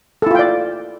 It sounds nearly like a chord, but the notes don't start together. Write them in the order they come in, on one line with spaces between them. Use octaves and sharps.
A4 E4 F4 G5 D5